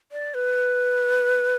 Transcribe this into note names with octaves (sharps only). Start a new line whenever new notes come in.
D5
B4